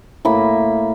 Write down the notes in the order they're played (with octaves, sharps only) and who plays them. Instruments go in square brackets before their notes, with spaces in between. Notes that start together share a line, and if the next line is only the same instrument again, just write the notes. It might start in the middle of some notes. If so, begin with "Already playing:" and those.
[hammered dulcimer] A2 A#3 B5